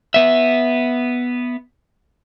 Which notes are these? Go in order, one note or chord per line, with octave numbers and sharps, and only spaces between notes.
B3 E5